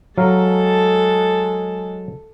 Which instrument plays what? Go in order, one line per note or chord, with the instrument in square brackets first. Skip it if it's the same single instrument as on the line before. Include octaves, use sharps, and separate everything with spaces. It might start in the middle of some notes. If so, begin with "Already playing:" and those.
[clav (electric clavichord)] F#3 F5 A#5 [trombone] G#3 [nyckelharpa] A4 A5